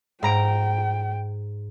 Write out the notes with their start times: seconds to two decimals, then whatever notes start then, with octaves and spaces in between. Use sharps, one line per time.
0.23 G#2 G5 A#5 D7